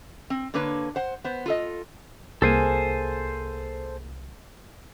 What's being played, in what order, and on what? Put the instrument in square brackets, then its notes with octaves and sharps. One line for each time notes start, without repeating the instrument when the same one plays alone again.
[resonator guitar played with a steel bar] C4
D3 A#3 D4 B4 C#5
C5 F#5
B3 C5
F4 A4 D#5
[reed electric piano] C2 [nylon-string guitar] A#3 G#4 [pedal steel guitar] A4 C5 G#5